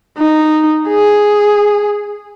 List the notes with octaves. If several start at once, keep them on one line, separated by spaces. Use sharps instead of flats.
D#4
G#4